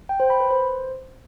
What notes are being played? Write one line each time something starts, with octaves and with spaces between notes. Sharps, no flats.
G5
C5
B5
B4
C5